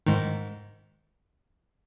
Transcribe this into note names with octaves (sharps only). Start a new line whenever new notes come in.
G#2 D#3